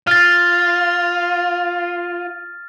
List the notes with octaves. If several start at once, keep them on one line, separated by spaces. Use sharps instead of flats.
F4 F6 A6